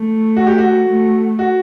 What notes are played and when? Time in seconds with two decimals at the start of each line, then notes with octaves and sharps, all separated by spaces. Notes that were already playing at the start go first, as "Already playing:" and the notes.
Already playing: A3
0.37 F#4
0.47 G4
0.58 F#4
0.88 A3
1.39 F#4